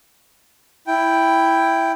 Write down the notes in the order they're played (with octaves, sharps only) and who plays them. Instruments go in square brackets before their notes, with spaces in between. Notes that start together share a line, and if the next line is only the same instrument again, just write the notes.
[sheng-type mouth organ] E4 G5